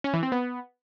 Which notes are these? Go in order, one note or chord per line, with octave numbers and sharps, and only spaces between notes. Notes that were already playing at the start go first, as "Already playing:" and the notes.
C#4
E3
C4
B3